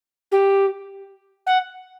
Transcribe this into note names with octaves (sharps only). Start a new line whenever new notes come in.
G4
F#5